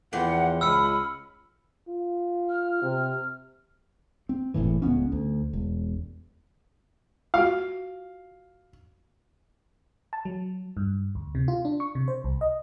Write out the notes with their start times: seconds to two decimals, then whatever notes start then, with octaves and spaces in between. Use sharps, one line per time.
0.13 E2 E3 F3 F#5 G5
0.61 C#2 B5 E6 F6 C#7
1.88 F4
2.49 F6
2.82 C3
4.29 C4
4.54 F#1 C#2 A2 E3
4.82 D1 C#2 B3 C#4
5.12 D2
5.53 E1
7.34 F4 F#4 F5
10.13 A5
10.25 F#3
10.77 G2
11.15 D2
11.35 C3
11.48 F4
11.65 D4
11.80 C#6
11.95 C3
12.08 C5
12.24 C2
12.41 D#5